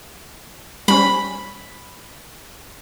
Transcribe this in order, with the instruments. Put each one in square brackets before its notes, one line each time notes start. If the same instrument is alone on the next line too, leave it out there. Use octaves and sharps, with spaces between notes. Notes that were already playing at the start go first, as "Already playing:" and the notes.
[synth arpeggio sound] G3 C#4 C5 [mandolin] B5